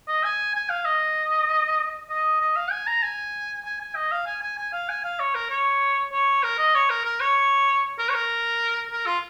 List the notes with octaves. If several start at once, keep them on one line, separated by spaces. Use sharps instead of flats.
D#5
G#5
G#5
F5
D#5
D#5
D#5
F5
G#5
A#5
G#5
G#5
G#5
D#5
F5
G#5
G#5
G#5
F5
G#5
F5
C#5
A#4
C#5
C#5
A#4
D#5
C#5
A#4
A#4
C#5
A#4
C#5
A#4
A#4
F4